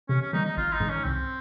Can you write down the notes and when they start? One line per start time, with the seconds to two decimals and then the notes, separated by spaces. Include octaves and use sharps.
0.09 C3 C#4
0.21 C#4
0.33 D#3 G3 D#4
0.45 D#4
0.57 G#1 F4
0.73 D#4
0.80 G#2 D#3
0.89 C#4
1.04 C2 C4